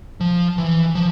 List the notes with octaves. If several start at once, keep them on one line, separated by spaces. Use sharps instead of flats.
F3
E3
F3